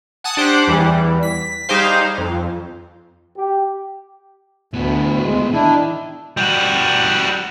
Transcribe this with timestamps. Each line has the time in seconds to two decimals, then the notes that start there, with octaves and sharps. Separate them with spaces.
0.24 F#5 G#5 A5 D#6
0.37 D4 G4 C5 F#5 D6
0.68 E2 E3 G3
1.23 B6
1.69 G3 D#4 G4 G#4 C5 F5
2.18 F2
3.37 G4
4.73 D2 A2 B3
5.23 G#3
5.53 D#3 D4 E4
6.37 G3 F#4